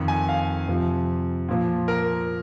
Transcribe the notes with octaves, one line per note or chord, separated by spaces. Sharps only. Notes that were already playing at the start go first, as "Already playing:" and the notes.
Already playing: F2 D#3
G#5
F5
F2 C3 F3
A#2 F3
A#4